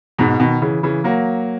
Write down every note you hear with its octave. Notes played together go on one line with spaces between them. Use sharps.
G#2 B2
B2 D#3
C#3 E3
C#3 E3
F#3 A#3